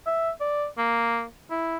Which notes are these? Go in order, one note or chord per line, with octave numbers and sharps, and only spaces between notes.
E5
D5
A#3
E4